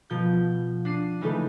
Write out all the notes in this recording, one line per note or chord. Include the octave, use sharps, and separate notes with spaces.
B2 F3 G6
D4 C7 D#7
C#3 E3 G#3 A3 D#4 B4